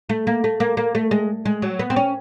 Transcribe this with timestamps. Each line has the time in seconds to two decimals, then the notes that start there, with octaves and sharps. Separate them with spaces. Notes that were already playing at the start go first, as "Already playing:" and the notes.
0.09 A3
0.27 A#3
0.44 A3
0.60 A#3
0.77 A#3
0.95 A3
1.11 G#3
1.45 G#3
1.62 F#3
1.79 B3
1.90 C4
1.96 C#4